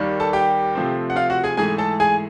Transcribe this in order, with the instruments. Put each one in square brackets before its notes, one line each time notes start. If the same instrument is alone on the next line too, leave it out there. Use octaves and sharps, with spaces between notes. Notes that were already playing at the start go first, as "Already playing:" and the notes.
Already playing: [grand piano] D#2 D#3 G3 A#3
A4 A5
G4 G5
C3 F3 A3 C4
F#5
F4 F5
F#4 F#5
G#4 G#5
G#2 E3 A3 G#4 G#5
A4 A5
G#4 G#5